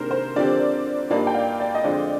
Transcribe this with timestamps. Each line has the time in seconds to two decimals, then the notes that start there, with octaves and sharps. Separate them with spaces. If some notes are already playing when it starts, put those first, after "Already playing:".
Already playing: C3 D#3 A#3 D4 G#4 A#4 C5
0.11 C5
0.36 D3 F3 C4 G4 D5
1.10 G2 F3 A#3 D#4 D5
1.27 G5
1.34 F5
1.60 D5
1.75 D#5
1.84 F2 D3 G#3 C4 F4 D5